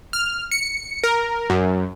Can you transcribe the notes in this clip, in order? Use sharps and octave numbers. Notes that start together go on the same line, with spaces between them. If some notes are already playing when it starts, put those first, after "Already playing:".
F6
C#7
A#4
F#2